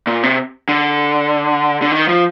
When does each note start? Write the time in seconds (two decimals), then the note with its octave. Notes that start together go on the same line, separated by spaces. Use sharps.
0.07 A#2
0.23 C3
0.69 D3
1.82 D3
1.92 D#3
2.08 F3